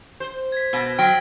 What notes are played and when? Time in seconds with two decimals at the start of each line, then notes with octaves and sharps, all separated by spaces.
0.20 C5
0.52 G#6 B6
0.73 B2
0.99 F#3 G5 F6 A#6 B6